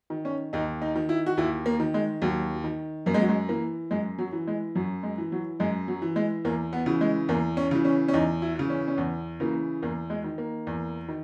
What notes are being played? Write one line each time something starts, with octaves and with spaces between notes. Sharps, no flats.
D#3
C#4
D#2 D#4
D#4
D#3
E4
F#4
D#2 E4
A#3
D#3
G#3
D#2 F#3
D#3
F#2 A#3
G#3
F#3
G#3
E3 A#3
F#2 G#3
F#3
E3
G#3
F#2 F#3
G#3
E3
F#3
F#2 G#3
F#3
E3
G#3
E2 A#3
B3
C#3 E3
G#3
E2 A#3
C#4
C#3 E3
C#4
C#4
E2 D#4
E4
C#3 E3
C#4
C#4
E2 B3
C#3 E3 A#3
E2 A#3
G#3
D#3
A#3
E2
D#3